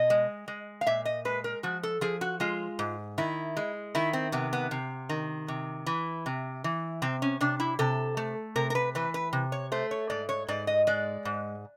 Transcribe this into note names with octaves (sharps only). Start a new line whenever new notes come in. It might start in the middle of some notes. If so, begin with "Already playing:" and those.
Already playing: B2 D#5
G#3
G#3
F5
A#2 E5
D#5
G#3 B4
A#4
F3 F#4
A4
F3 G#4
F#4
G#3 F4
G#2
D#3 E4
G#3
D#3 E4
C4
C3 B3
B3
C3
D#3
C3
E3
C3
E3
C3 C4
C#4
C3 D4
E4
C3 A4
A3
C3 A#4
A#4
B4
E3 B4
B4
C3
C#5
A3 C5
C#5
G#2 D5
C#5
G#2 D5
D#5
G#3 D5
G#2